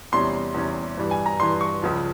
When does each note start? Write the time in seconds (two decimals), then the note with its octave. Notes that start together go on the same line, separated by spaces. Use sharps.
0.12 E2 C3 G3 C#4 C6
0.54 E2 C3 G3 C#4
0.97 G2 E3 G3
1.11 G#5
1.26 A#5
1.40 G2 E3 G3 C6
1.61 C#6
1.83 C#2 C#3 F3